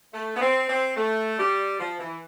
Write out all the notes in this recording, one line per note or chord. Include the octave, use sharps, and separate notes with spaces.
A3
B3
C4
C4
A3
G3
F3
E3